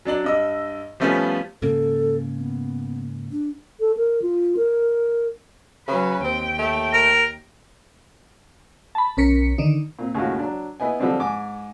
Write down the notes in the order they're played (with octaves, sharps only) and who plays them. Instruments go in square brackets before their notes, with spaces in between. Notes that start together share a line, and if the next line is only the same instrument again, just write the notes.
[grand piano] F#3 D4 D5 F#7
G2 D#5 E6
F3 G3 A3 B3 C#4 F4
[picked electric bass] G#2 C#3 A#3 [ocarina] A4
[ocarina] B3
D4
[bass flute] A4
A#4
F4
A#4
[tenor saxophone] C#3 [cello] F#3 B4
[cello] D#2 G5 [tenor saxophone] C4
[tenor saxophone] A3
[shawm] A#4
[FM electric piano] A5 B5
B1 C#4 A#4 B6 C#7
D3 D#3 D4 D#4
[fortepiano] A#2 C4
D#2 A2 C#3 G#3 F4 F#4
F#3 D4
B3 E4 B4 D#5 G#5
D3 F3 G3 G#3 C4 D4
G#2 G#5 D6